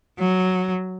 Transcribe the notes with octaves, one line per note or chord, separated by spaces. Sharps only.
F#3